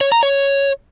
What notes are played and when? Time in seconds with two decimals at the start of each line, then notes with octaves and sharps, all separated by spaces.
0.01 C#5
0.12 A#5
0.23 C#5